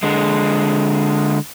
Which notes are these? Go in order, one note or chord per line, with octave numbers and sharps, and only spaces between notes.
D3 G#3